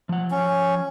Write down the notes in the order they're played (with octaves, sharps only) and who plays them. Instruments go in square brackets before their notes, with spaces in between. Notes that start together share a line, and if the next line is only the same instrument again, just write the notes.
[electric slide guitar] F3 F#5
[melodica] C#4